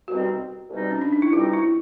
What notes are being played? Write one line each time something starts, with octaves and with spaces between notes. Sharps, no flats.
C2 B2 G3 C4 D#4 F#4
C2 B2 G3 C4 D#4
C#4
D4
D#4
E4
C2 B2 G3 C4 D#4 F4
E4